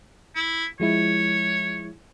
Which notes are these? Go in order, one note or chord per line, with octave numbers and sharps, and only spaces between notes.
E4
F3 G#3 E4 C#5